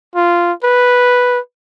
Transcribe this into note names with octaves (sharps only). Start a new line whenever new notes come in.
F4
B4